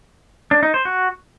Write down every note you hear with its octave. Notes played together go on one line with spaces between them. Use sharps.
D4
D#4
C5
F#4